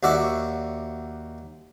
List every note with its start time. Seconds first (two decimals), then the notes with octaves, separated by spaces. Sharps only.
0.03 D#2 F#4 D5 E5 C#6